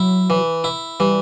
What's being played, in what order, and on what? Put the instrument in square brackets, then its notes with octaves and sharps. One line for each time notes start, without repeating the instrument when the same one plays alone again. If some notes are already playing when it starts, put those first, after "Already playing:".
Already playing: [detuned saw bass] F#3 [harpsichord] E4
[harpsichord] E3
E4
[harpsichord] E3 [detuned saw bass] G3